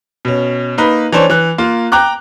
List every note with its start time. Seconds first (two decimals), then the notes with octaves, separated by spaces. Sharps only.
0.25 B2 C#4
0.78 A#3 D#4 B4
1.12 E3 C#4 D4 C5 C#5
1.30 E3 F#6
1.58 A#3 F4
1.92 G5 A#5 D6 F#6